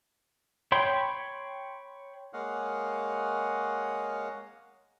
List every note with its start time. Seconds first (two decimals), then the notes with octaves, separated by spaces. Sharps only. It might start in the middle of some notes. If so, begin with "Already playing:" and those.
0.72 C#5 G5 B5 C6
2.33 G#3 A#3 C#5 D#5 F5 F#5